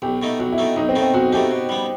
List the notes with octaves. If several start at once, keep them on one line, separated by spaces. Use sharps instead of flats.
B1 G4
B2 A3 D#4
B1 F#4
E4
B2 A3 D#4
B1 D#4
C4
B2 A3 D#4
C4
B1 F#4
B2 A3 D#4 G4
B2
G3 B3